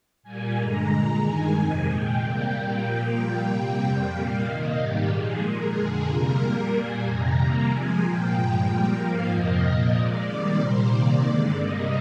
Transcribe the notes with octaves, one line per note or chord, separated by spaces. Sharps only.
A#2 G3 A#3 G#5
G2 D3 G#3 A#5
A#2 G#3
G2 D#3 G#3 G#5
F2 C3 D#3
A#2 G#3 G5
C3 G3 A#3
A#2 G3 A#3
A#2 F3 A#3 G5
A#2 G3 A#3 G5
C3 G3 A#3
F2 C3 G3
A#2 G3 A#3 F5
C3 D#3 A#3 D#5
G#2 D#3 G3 G4
A#2 F3 G#3 G#4
A#2 G#3 A#4
F2 D3 F3 G#3 G#4
C3 G3 A#3 A#4
A#2 G3 A#3
A#2 G3 A#3 G#5
F2 C3 D#3 A#5
C3 G3 A#3
C3 F3 G#3 G#5
A#2 F3 A#3 G5
G2 F3 G#3
A#2 G3 A#3 G5
G#2 F3 A#3 F5
F2 C3 F3 A#3 D#5
A#2 F3 A#3
A#2 G#3 D5
C3 D#3 G3 A#3
A#2 G3 A#3 C5
C3 D#3 A#3 D5
G2 D3 G#3 D5
C3 G3 A#3 D#5